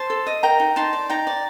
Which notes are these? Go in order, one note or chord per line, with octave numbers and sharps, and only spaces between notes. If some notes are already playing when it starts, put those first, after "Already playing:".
Already playing: C5 A5 C6
A4
D#5
A#4 G5 A#5
D#4
D#4 A5 C6
D5
D#4 G5 A#5
D5